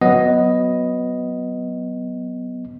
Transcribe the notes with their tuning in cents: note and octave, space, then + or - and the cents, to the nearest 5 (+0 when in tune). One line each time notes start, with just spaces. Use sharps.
F#3 +0 B3 +0 D#5 +0